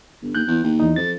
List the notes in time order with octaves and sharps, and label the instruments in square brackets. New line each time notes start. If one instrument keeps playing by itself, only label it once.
[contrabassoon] G1
[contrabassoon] D#2 [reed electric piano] F#6 G6
[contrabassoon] E2
D#2
[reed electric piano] E2 D#4
[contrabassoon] F2 [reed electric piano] A6